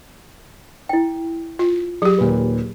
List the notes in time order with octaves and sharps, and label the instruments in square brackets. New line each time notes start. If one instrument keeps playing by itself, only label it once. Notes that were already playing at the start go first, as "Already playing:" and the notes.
[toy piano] E4 G5
[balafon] F4
[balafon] F#3 G4 [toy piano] G#4
[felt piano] D#2 A#2 B4